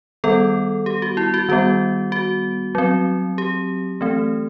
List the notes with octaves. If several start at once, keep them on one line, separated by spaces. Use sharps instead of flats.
D#3 G3 B3 A4
G4
F#4
E4
F#4
D#3 G3 B3 F#4
F#4
F#3 C4
G4
E3 A3 C4